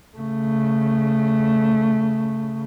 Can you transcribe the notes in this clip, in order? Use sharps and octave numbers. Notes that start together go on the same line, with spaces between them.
C#3 A3